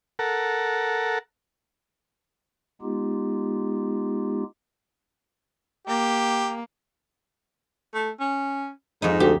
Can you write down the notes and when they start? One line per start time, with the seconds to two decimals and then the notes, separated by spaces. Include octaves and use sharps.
0.19 A4 A#4 F#5
2.81 G#3 B3 D#4 F4 G4
5.88 A#3 G4
7.94 A3
8.20 C#4
9.02 F2 G#2 D#4
9.20 D2 G4